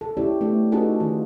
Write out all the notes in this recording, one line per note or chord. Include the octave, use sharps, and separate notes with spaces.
A4
C#4 E4 G4 A4 C#5 D5
A3 B3 D4
C#4 D#4 F#4 G#4 A4 B4
D#3 F4